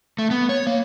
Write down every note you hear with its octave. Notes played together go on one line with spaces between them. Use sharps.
A3
B3
C#5
A#3